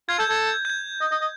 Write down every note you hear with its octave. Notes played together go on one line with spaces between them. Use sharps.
F4 G#6
A4 G6
A4 G#6
G6
G#6
D#5
D#5
D#5